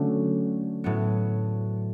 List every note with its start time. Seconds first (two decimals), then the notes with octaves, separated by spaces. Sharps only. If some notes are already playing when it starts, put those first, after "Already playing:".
Already playing: D3 F#3 A3 C#4
0.84 A2 F#3 B3